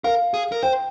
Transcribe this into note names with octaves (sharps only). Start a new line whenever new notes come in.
A#4 F5
G#4
A#4
C5 G5